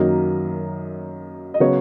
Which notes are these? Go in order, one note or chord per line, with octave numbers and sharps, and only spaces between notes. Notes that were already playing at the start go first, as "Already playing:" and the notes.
Already playing: F#2 D#3 F#3 A#3 D#5
D#5
C#3 F#3 B3 C#5